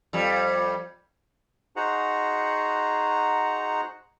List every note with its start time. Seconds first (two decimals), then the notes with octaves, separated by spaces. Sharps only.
0.13 F2 G3
1.76 D#4 F#4 G#4 C5 F#5 A#5